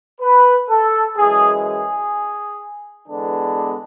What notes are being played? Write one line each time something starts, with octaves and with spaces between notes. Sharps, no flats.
B4
A4
F#2 E3 G#3 G#4
G#4
E2 D3 G#3 B3 D4